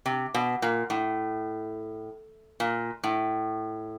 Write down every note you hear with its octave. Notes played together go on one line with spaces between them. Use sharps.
C3
B2
A#2
A2
A#2
A2